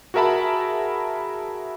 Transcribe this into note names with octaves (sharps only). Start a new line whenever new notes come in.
F#4 G#4 A#4 E5 A5 B5